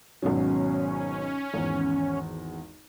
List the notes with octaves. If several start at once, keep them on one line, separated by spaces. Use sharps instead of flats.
G#1 B2 F#3 C#4
G#1 E2